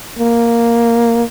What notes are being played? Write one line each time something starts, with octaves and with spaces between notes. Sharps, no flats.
A#3